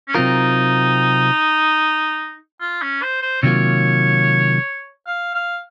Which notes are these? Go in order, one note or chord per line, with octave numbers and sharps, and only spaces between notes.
C#4
C3 F#3 C4 D#4 F4 A#4
F4
C#4
C5
C5
C3 D#3 F#3 A#3 F4 C#5
F5
F5